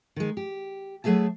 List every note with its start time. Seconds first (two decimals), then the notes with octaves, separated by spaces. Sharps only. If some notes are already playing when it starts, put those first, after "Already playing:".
0.16 D#3 G#3
0.37 G4
1.04 F#3 A3 G#4 E5 A5